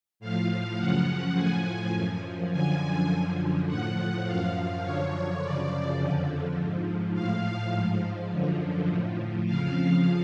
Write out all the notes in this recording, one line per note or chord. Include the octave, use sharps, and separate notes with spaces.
A2 F3 F5
F#2 C#3 F3 F#5
A2 F3 G#5
F#2 F3
F#2 D3 F3 G#5
F#2 D3 F3
A2 F3 F#5
F#2 F3 F5
F#2 D3 F3 C#5
F#2 C#3 F3 D5
F2 D3 F3
G#2 F3
A2 F3 F5
G#2 F3
F#2 D3 F3
A2 F3
F2 C#3 F3 F5